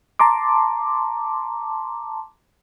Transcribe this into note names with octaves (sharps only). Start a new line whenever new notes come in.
A5 A#5 C6 D6